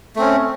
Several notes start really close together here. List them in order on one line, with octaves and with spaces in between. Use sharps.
A3 C4 C#4